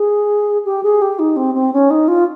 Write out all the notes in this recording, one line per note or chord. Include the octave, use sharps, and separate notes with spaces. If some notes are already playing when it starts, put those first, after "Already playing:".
Already playing: G#4
G4
G#4
G4
D#4
C4
C4
C#4
D#4
F4